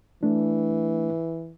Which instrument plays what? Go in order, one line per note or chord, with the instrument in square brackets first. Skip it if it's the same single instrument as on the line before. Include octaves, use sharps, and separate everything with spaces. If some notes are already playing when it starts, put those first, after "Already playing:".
[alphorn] E3 [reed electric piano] A3 D4